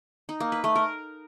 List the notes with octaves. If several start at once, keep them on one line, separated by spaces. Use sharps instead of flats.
D#4
A#3
B4
A3
A#4